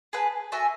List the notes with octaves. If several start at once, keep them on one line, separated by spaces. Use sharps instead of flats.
G#4 B4 F#5 A5
F#4 A4 E5 G#5